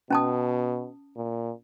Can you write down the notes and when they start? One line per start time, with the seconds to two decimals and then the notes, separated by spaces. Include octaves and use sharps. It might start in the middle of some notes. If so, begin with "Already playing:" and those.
0.10 B2 C#4 A5 D#6
1.17 A#2